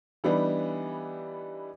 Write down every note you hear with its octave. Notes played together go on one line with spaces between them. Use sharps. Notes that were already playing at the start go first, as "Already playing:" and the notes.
E3 G3 B3 D4 D#4